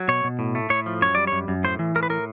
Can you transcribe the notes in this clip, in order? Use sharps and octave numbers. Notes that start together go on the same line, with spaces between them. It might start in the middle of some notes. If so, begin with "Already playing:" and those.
Already playing: F#3
B2 C#5
B2
A2
A3
A2 C#5
F3
F#2 C#5
G3 D5
F#2 C#5
F#2
A2 C5
E3
A2 A#4
B4
A2 A#4